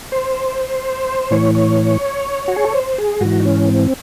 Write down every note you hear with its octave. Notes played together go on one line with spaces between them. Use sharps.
C5
A2 E3 C#5
C#5
F#4
G#4
A4
C5
G#4
G#2 E3 F#4
D#4
C#4
C4